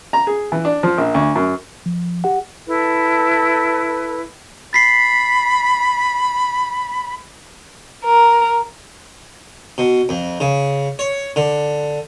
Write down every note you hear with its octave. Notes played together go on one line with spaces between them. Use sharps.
A#5
G#4
E3
D4
F3
A#1
D2
F#2
F3
G4 F#5
E4 A4 B4
B5 A6 B6 C7
A#4
B2
F2
C#3
C#5
D3